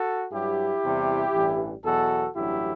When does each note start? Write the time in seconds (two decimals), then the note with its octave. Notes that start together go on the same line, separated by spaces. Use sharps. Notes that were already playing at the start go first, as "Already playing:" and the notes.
Already playing: F#4 A4
0.32 G2 F#3 E4 G4
0.83 E2 C3 G3
1.34 A1 G2 E3 G3
1.84 E2 B2 F#3 F#4 A4
2.35 A1 G2 D3 F#3 E4 G4